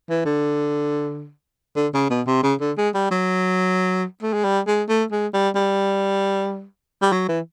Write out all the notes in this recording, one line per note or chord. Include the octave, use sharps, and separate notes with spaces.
E3
D3
D3
C#3
B2
C3
C#3
D3
G#3
G3
F#3
A3
G#3
G3
G#3
A3
G#3
G3
G3
G3
F#3
E3